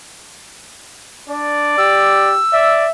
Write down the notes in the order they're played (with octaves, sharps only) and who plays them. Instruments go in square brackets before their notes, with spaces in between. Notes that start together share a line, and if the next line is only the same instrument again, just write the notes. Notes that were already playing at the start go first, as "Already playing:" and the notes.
[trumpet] D4 [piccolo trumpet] D5
[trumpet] G4 [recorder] E6
[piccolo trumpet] D5 [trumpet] E5